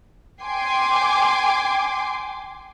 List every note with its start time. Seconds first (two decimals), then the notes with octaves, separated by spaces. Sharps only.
0.42 G5 G#5 C6 D6